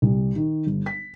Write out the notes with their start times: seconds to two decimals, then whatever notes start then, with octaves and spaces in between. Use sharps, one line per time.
0.02 C2
0.36 D#3
0.67 G1
0.86 B6